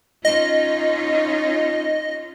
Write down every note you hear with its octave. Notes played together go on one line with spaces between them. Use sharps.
C#4 D#4 F4 D#5